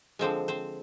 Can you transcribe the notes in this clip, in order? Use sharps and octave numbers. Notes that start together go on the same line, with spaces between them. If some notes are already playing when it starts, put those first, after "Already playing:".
D3 F3 G#3 C4 C5
C4 C5